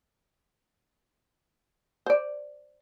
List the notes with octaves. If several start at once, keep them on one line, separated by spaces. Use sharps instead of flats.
C5 D5